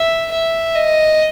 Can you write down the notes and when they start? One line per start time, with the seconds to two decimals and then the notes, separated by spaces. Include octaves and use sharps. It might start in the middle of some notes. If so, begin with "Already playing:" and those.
Already playing: E5
0.32 E5
0.75 D#5